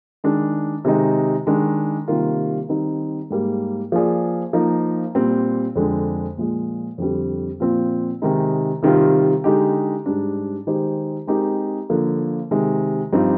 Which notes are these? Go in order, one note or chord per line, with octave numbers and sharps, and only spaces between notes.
D#3 G#3 D4
C3 D#3 G#3 D#4
D#3 G#3 D4
C3 D#3 G3 A#3 F4
D#3 G3 C4 D#4
G#2 G3 A#3
F3 A#3 F4 G#4 D5
F3 A#3 D#4 A#4
A#2 G3 C4
F2 D3 G#3 D4
A#2 F3 G#3
F2 D3 G3 C4
A#2 F3 C4 F4
C3 D#3 G#3 D#4
C3 D#3 G3 C4 F4
D3 G#3 D#4 G4
G#2 G3 D4
D#3 G#3 D#4 G4 C5
G#3 C4 D#4 G4 A#4
D3 F3 A#3
C3 D#3 G#3
G2 F3 C4 D#4 G4